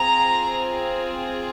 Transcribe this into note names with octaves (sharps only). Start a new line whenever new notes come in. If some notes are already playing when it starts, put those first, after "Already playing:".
Already playing: C4 F4 G#4 A#5